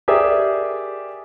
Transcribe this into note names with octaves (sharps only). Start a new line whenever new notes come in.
G4 G#4 A#4 D5 E5